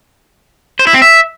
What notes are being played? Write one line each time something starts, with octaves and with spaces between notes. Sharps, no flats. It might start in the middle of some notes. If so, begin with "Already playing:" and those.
C5
E4
C4
E5